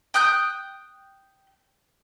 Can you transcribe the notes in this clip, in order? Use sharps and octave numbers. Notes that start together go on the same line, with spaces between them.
G5 D#6 F#6 G6